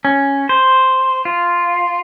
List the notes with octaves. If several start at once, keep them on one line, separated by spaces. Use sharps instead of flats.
C#4
C5
F4